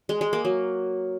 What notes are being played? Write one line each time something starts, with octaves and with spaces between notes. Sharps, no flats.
G#3
G#3
A#3
F#3